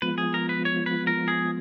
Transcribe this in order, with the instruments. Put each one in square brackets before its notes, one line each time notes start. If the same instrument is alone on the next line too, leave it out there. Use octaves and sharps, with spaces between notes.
[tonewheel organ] F3 G#3 B3 F4 [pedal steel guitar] B4
[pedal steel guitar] G#4
A#4
B4
C#5
B4
A#4
G#4